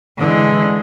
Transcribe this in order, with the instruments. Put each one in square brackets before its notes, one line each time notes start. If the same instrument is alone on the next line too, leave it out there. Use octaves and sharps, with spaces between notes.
[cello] D3 [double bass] E3 [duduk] G#3